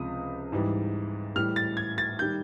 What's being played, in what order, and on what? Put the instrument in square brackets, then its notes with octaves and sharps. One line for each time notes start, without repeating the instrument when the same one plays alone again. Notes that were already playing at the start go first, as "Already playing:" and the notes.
Already playing: [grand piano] C#2 C3 F3 D#6
G#2 E3 G3
A2 E3 G3 F6
A6
G#6
A6
D#3 G3 G6